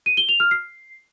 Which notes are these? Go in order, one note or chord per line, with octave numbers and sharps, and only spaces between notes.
D#7
G7
F7
F6
C7